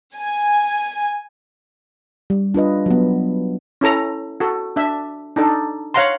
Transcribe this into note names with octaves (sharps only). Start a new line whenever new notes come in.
G#5
G3
D4 F4 B4 D#5
F#3 B3
C#4 E4 A4 A#5
F#4 A4
D4 E5
D4 D#4 A4
C#5 F5 F#5 A#5 C6